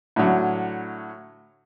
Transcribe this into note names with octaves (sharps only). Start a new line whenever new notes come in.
A2 D3 F#3